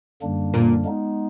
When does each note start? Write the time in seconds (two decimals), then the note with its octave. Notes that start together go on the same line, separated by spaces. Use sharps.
0.22 F#2 D3 G3 A#3 D4
0.54 A#2
0.85 G#3 B3 D#4